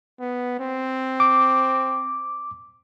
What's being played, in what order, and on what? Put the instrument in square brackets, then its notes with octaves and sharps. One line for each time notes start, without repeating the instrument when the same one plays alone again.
[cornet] B3
C4
[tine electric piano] D6